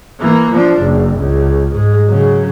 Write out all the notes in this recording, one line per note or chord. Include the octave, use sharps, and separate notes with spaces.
E3 A#3
F3 D4
F#1
C#2
G#2 G#3
C#3 F#3